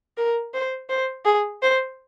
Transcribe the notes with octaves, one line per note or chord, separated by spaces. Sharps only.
A#4
C5
C5
G#4
C5